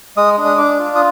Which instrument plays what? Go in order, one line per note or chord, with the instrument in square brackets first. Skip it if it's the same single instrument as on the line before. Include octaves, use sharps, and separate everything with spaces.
[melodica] G#3 D#6
D4
D#6
D4 D6
F4
D#6